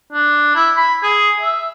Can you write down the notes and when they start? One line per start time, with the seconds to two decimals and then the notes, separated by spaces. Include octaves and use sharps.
0.13 D4
0.56 E4
0.77 B5
1.03 G#4
1.41 E5